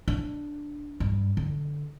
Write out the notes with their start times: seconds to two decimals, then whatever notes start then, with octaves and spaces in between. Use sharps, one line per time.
0.08 D4
1.00 G2
1.37 D3